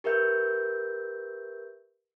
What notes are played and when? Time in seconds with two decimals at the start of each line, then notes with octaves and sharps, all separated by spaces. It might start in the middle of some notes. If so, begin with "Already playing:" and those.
0.04 G4 A#4 B4 E5 G6